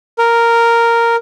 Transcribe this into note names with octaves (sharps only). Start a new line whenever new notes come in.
A#4